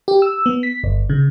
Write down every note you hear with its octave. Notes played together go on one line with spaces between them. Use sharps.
G4
E6
B3
B6
G1
C#3